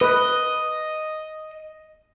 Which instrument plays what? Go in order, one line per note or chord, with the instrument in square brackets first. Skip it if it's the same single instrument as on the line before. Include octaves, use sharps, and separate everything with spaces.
[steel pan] B4 [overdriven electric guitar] D#5